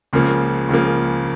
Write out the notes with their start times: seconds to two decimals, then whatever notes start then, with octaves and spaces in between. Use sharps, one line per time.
0.13 C#2 C#3 F3 A#3
0.69 C#2 C#3 F3 A#3